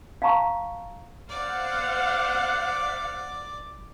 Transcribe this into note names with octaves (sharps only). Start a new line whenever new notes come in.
F5 F#5 A5 A#5 C#6
C5 D5 F5 F#5